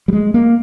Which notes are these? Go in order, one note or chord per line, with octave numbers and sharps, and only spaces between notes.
G3
G#3
A#3